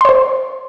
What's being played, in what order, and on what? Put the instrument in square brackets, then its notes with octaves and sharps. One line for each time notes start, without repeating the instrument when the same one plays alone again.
[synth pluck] C6
C#5
C5